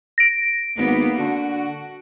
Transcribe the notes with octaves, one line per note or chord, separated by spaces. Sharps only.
A#6 D7
G#1 A#3 B3
D3 F#4